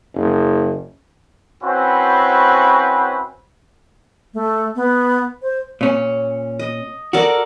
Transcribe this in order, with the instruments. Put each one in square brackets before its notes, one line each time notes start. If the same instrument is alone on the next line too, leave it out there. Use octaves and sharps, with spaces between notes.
[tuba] F#1
[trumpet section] C4 C#4 E4 F#4 B4 C5
[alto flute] A3
B3
C5
[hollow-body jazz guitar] A#2 C#4
[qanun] D#5
[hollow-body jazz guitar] F#4 [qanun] A4 A#4 D5